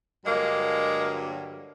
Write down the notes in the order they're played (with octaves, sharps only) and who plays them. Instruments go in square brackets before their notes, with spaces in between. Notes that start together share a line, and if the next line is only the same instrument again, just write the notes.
[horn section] G2 D3 F#3 G#3 A#3